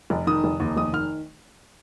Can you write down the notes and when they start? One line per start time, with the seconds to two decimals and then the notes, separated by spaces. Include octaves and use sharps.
0.10 F1
0.27 D#3 D#6
0.44 F1
0.60 D#2
0.77 F1 D#6
0.93 D#3 F6